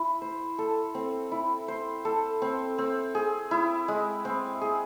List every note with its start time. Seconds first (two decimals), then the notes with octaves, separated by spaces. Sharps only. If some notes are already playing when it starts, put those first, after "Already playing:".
Already playing: E4
0.22 C5
0.58 A4
0.95 C4
1.32 E4
1.68 C5
2.05 A4
2.42 C4
2.78 C4
3.15 G#4
3.51 E4
3.88 G#3
4.25 C4
4.61 G#4